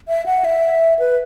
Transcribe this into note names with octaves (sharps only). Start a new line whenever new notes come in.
E5
F#5
E5
B4